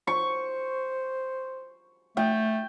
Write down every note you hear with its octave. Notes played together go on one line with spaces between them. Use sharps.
C5 C#6
A3 G5